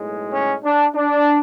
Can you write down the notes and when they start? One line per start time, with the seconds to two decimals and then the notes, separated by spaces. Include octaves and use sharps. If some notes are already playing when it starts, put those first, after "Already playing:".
Already playing: B1 A2 G#3
0.32 C#4
0.64 D4
0.95 D4